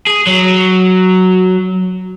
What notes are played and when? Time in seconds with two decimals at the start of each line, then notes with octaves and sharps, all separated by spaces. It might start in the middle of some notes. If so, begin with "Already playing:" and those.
0.07 G#4
0.27 F#3